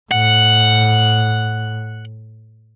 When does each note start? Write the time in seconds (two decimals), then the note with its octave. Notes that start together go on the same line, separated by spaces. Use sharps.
0.11 A2 F#5